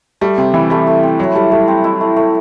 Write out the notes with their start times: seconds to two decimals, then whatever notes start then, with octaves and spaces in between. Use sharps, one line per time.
0.21 G3 A3
0.38 C3 C4
0.54 E3 E4
0.70 G3 A3
0.87 A3
1.03 C4
1.19 F#3 E4
1.35 G3 A3
1.52 G3 A3
1.68 C4
1.84 E4
2.01 A3
2.16 A3